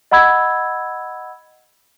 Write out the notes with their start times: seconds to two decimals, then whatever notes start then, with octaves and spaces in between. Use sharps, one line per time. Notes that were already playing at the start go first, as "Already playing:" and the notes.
0.11 D#5 F#5 B5 E6 G#6